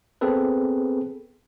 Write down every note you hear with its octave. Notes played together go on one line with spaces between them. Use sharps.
B3 C4 G#4 A4 B4